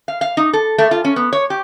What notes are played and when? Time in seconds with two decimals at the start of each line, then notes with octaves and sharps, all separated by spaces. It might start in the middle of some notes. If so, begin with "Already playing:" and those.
0.08 F5
0.21 F5
0.37 D#4
0.53 A4
0.78 A3
0.91 F4
1.05 C#4
1.16 B3
1.33 C#5
1.50 G4